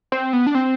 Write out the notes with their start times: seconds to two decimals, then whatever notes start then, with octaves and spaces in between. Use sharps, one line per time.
0.12 C4
0.33 B3
0.47 D4
0.55 C4